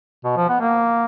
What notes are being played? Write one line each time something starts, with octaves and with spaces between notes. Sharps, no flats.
B2
F3
B3
A#3